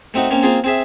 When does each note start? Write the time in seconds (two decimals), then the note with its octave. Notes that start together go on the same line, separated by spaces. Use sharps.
0.14 A3 C4 D#4 F#4
0.31 A#3 C4 C#4
0.43 A#3 C4 F4 G#4
0.64 C4 G#4 E5